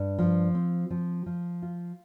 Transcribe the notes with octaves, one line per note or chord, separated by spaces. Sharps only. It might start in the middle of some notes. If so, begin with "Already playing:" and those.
Already playing: G2
F3
C4
F3
F3
F4